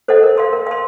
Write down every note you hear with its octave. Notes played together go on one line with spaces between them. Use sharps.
A4 C5 D#5 F#5
A#4
F5 C6
A#4
F5 C6